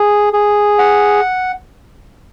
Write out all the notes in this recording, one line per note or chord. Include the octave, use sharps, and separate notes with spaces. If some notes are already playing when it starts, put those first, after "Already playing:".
Already playing: G#4
G#4
F#5